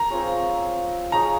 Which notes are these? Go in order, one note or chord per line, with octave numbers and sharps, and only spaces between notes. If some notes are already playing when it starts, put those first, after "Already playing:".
Already playing: A#4 A#5
C4 F4 G#4 C#5
D#4 G#4 C#5 F5 A#5